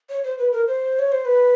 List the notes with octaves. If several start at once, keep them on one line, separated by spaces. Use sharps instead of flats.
C#5
C5
B4
A#4
C5
C#5
C5
B4